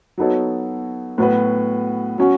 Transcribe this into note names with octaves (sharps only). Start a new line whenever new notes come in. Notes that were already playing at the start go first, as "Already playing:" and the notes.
F#3 B3 D#4 A4 C#5
A2 F#3 B3 F#4 B4
F#3 C#4 F#4